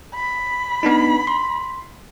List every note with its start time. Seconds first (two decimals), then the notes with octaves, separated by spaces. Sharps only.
0.15 B5
0.83 B3 D4 D#4
1.27 C6